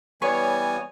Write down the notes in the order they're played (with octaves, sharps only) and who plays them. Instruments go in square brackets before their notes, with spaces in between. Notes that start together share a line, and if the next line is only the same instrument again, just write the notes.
[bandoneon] E3 G3 B3 [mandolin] C#5 [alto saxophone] G#5